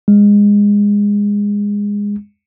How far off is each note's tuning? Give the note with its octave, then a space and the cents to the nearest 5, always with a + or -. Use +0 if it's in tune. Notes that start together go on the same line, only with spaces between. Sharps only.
G#3 -20